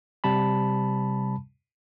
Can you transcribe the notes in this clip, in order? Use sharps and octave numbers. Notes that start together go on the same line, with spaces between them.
C3 G3 A5 B5